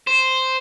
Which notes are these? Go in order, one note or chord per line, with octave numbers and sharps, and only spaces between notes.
C5